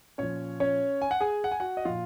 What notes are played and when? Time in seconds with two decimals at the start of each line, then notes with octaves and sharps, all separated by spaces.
0.18 A#2 F3 C#4 C#5
0.60 C#4 C#5
1.02 G#5
1.11 F#5
1.21 G#4 G#5
1.44 F#5
1.51 G#5
1.60 F#4 F#5
1.77 D#5
1.85 A#2 F3 F4 F5